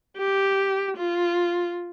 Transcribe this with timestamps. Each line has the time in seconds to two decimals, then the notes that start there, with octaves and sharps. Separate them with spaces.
0.17 G4
0.97 F4